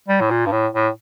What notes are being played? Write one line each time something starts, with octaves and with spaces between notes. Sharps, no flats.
G3
A2
A#2
G2
A2
A2